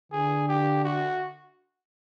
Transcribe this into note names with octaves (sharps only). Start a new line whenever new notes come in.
D3 G#4
G4
F#4